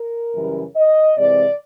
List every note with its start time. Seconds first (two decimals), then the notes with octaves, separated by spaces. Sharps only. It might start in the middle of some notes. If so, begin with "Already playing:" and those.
Already playing: A#4
0.34 F#2 C#3 E3 G3
0.76 D#5
1.17 C3 E3 G#3 C4 D5